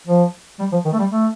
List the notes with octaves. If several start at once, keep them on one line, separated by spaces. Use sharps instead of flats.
F3
G3
F3
D#3
A3
G3
A3